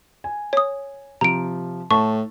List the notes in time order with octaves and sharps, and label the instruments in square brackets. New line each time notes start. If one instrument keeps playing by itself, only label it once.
[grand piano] G#5
[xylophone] C#5 D#6
[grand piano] C3 F3 [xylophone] A#5 D7
[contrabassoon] A2 [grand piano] A4 A5 [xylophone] C#6